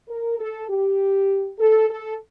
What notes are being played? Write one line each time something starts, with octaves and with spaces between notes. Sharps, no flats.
A#4
A4
G4
A4
A4